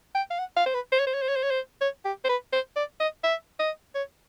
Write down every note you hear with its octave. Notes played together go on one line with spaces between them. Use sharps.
G5
F5
F#5
F5
C5
B4
C5
C#5
C5
C#5
C5
C#5
C5
C#5
C5
C#5
G4
C5
B4
C5
D5
D#5
E5
D#5
C#5